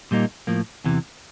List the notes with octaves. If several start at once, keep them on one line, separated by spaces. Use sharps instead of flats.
A#2 G3 A#3 D#4
A2 F3 A#3
E2 C3 E3